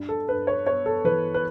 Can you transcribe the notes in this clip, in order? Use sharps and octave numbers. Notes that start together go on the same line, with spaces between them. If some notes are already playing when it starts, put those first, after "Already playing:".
Already playing: G2
A4
G2 B4
C#5
B3 C#5
A4
E3 B4
B4